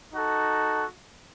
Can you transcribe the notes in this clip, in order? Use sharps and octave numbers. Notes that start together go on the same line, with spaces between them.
D#4 F#4 A4